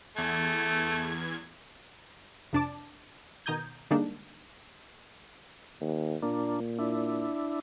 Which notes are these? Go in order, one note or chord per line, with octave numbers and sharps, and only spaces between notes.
E2 A3 G#6
F2 C3 D4 D5 A5 D6
B2 D#3 A#5 D#6 G6 G#6
D3 G3 G#3 A#3 D4 D#4
D#2
A#2 A#3 D4
D4 E4